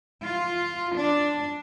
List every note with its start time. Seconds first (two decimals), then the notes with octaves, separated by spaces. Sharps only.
0.22 F4
0.95 D4